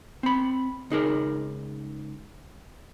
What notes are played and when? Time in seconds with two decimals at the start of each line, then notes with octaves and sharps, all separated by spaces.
0.23 C4 B5
0.90 C#2 D#4 G#4 A#4